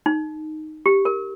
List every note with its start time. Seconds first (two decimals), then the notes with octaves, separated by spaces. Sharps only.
0.06 D#4
0.86 G4
1.05 A#4